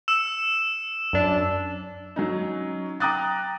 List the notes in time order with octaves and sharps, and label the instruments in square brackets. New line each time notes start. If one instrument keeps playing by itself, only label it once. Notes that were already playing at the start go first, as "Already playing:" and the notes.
[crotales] E6 E7
[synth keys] F#2 D4
[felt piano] F#3 C#4 D#4
G5 A#5 D6 D#6 F#6 A6